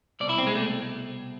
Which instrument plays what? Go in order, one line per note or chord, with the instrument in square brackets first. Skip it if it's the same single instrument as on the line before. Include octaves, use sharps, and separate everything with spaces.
[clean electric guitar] C2 B2 D5
E4
C4
G#3
A3